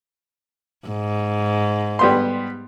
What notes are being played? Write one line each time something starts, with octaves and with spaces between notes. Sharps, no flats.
G#2
G3 B3 C6